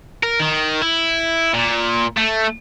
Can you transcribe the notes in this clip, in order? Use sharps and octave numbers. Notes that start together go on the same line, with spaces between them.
A#4
D#3
E4
A#2
A3